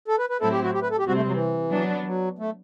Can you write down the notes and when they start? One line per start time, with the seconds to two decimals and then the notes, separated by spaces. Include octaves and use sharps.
0.08 A4
0.19 B4
0.30 B4
0.41 A2 F#3 C4 E4 A4
0.52 G4
0.63 F#4
0.74 G4
0.83 B4
0.91 A4
0.99 G4
1.07 C3 G3 C4 F#4
1.15 A3
1.28 F#3
1.32 E3
1.72 F#3 B3 D4
2.01 E3
2.06 F#3
2.39 A3